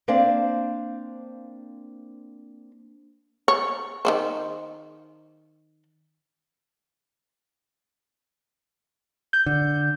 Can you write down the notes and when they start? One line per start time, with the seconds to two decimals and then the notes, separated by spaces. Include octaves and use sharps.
0.08 A#3 C4 D4 C5 F5
3.48 C#5
4.05 D#3 B3 C5
9.33 G6
9.46 D3